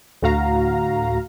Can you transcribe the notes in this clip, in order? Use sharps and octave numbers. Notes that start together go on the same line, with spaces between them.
D2 A2 F#4 F5 A#5